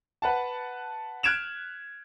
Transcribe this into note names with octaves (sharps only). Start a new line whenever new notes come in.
B4 F#5 A5
F6 F#6 G#6 D7 E7 F7